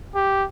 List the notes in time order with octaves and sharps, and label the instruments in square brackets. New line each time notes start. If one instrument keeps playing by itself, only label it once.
[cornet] G4